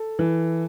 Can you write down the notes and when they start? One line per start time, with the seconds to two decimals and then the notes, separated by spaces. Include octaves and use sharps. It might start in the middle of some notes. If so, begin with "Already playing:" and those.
Already playing: A4
0.19 E3